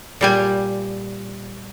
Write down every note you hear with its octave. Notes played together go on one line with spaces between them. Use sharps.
A#2 G3 G#5